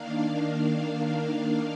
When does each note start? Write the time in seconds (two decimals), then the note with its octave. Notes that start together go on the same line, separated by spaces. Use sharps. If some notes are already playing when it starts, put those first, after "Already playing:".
Already playing: D#3 A#3 D4 F5